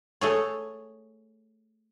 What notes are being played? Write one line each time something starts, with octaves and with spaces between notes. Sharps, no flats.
A3 G#4 C#5